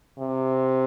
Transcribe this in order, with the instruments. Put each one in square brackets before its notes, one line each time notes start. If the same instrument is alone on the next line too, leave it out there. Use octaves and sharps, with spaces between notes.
[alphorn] C3